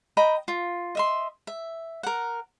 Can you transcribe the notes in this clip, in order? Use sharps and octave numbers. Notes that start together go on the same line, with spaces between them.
D#5 G5 A#5 B5
F4
D#5 E5 C6
E5
A#4 F#5